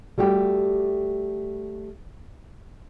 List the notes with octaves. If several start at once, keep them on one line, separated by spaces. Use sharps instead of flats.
G3 A3 F#4 G4